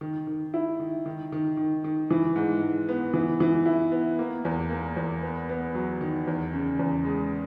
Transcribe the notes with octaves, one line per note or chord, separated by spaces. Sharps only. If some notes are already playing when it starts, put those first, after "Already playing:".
D#3
D#3
E4
D#3
D#3
D#3
D#3
D#3
E3
G#2
G#2
B3
E3
E3
E4
B3
A#3
E2
A#3
E2
B3
B3
F#3
D#3
E2
C#3
E2
G#3